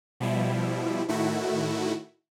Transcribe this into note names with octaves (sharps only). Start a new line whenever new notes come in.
B2 F3 G3 E4
A2 D#3 A3 E4 F#4